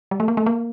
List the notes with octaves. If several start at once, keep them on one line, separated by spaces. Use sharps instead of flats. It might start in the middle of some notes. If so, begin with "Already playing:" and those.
G3
A3
A#3
A3
A#3